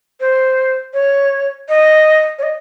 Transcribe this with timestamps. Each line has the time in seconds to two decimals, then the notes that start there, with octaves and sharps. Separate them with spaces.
0.20 C5
0.94 C#5
1.69 D#5
2.39 C#5
2.43 D#5